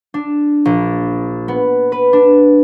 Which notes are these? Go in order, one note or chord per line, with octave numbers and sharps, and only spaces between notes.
D4
A#1
B3
B4
D4